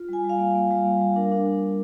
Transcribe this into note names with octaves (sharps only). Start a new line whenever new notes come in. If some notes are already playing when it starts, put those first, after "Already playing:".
Already playing: F4
G3 G#5
G3
F5
A#3 G5
A#3
G3
A#3
G3
D4 A#4
D4